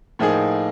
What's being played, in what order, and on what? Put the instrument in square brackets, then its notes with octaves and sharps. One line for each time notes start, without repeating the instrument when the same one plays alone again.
[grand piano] A2 F3 A#3 D#4 G#4